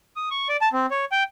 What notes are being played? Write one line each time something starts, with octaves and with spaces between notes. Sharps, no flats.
D#6
C#6
D5
A5
C4
C#5
G5